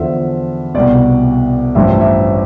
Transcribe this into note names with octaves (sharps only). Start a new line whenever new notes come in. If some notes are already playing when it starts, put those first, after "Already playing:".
Already playing: E2 D3 F3 E5
C2 B2 D5
A1 G2 F3 E5
E5